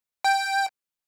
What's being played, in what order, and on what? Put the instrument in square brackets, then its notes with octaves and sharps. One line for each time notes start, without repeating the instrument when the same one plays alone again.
[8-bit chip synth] G5